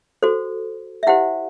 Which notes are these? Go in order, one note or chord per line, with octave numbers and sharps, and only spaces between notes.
F#4 A4 C5
E5
E4 G4 C5 F#5